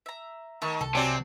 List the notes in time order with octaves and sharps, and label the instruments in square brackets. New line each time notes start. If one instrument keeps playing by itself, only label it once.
[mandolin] E5 A#5
[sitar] D#3 [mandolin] A3 C#6
[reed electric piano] C2 [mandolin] A4
[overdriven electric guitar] C3 [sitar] F#3 C4 D5 [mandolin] G#5